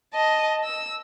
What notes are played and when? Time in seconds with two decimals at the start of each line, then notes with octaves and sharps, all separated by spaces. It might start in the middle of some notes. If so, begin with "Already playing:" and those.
0.13 D#5 A5
0.65 E6